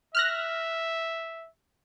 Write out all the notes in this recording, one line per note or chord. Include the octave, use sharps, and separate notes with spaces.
E5 F6 F#6 A#6